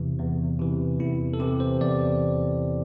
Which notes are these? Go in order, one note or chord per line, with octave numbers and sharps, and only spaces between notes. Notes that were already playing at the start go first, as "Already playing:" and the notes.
Already playing: E2 C3 E3
E2
C3 E3
E2 E4
A4
C3 E3 G4
C5
E2 D5